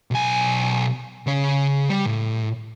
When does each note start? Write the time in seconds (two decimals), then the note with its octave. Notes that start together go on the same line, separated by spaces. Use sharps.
0.11 B1 G#5
1.27 C#3 C#5
1.89 G3
2.06 A2